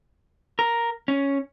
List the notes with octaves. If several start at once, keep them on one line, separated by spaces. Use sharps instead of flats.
A#4
C#4